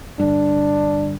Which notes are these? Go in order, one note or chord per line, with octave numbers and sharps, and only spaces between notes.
G2 D3 D4